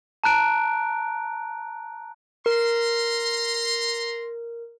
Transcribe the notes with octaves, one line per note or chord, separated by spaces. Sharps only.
A5 A#5 F#6 D7
A#4 A#5 C6